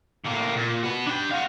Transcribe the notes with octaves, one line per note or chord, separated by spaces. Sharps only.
A2 A#3
A#2
F#4 B4
D4 G5
F#4 F5